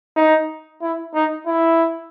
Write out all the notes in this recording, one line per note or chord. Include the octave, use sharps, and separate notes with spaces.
D#4
E4
D#4
E4